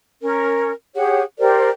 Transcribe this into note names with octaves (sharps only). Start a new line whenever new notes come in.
C#4 A#4
G4 G#4 C#5 F#5
G4 A#4 C5 D5